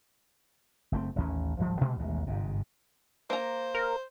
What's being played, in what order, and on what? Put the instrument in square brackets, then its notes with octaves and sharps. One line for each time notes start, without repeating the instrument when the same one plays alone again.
[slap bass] F#1 A3 C4
A1 D#2 C#4
D1 G#1 F3 G3
A#2 C#3 G#3 A3
A1 D#2 B2 G#3
G1 G#2 C3
[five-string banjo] A#3 A#5 [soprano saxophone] C5
[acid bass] A#4